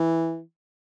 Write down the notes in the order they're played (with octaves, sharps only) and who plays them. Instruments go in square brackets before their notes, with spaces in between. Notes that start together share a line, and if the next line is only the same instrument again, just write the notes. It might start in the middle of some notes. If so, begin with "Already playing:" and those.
Already playing: [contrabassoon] E3